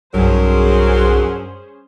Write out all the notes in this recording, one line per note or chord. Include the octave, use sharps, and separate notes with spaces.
B1 G2 F#3 C#4 G#4 A#4 C5